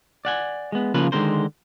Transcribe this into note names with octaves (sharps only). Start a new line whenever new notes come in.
D5 F#5 G#5
G#3 B3
C#3 F3 A#3 A#4 B4
D3 D#3 G#3 C#4 A#4 C5